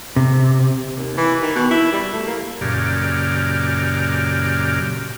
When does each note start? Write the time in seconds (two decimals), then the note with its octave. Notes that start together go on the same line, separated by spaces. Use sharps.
0.16 C3
0.97 D#2
1.17 E3
1.42 D#3
1.55 B2
1.71 E4
1.92 G3
2.13 A3
2.27 A#3
2.61 F#2 A#2 C#3 G4 D5 F6